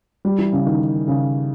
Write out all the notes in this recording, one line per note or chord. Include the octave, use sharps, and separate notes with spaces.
G3
E3
C#3
D#3
C#3